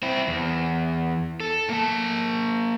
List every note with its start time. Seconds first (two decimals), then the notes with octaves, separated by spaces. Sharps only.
0.02 C4 E4
0.28 E2
1.40 A4
1.70 A#3 A5